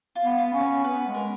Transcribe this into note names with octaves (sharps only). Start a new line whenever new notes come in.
F4
B3
F4
C#4
C#5
B3 B4
G#3
A#4